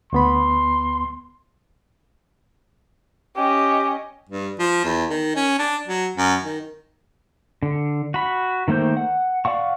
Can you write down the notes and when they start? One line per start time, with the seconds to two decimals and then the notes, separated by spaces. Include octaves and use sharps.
0.13 D2 B3 B5 C6
3.36 C#4 G4 D#5
4.29 G2
4.59 F3
4.84 E2
5.10 D#3
5.36 C#4
5.58 D4
5.87 F#3
6.17 F#2
6.43 D#3
7.63 D3
8.14 F#4 B5
8.68 D#3 A3 A#3 C5 G6
8.97 F#5
9.45 D5 F5 F#5 C#6